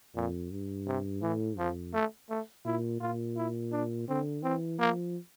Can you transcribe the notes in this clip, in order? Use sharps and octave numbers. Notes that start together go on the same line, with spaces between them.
F2 A#2
G2
C3
A2 E3
F2 F3
A3
A3
A#2 E4
A#2 F4
E4
D4
D3 C4
E3 C4
F3 A#3